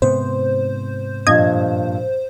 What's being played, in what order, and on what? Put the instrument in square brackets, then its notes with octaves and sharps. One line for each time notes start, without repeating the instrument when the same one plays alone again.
[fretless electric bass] G#2 C3 B3 [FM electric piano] C5
[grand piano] G2 A#2 F3 [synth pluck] D#5 G#6